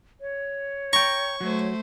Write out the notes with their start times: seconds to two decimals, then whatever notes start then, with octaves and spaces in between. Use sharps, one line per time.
0.21 C#5
0.93 G5 A#5 C#6
1.41 F#3 A3 C5